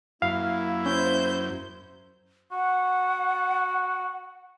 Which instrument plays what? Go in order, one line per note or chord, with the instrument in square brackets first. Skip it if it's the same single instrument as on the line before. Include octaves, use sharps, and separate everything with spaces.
[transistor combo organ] F#2 [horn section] A#3 E4 [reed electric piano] F5
[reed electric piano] C#4 [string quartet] C5 G6
[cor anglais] F#4 [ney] F#5